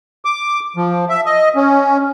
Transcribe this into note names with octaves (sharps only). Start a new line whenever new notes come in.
D6
F3
E5
D#5
C#4